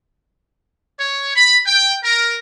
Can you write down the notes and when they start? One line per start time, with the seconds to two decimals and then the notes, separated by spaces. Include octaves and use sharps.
0.98 C#5
1.36 B5
1.65 G5
2.02 A#4